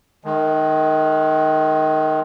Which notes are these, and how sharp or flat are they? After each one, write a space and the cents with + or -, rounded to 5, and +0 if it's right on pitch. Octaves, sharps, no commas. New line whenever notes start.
D#3 -10 G#3 +25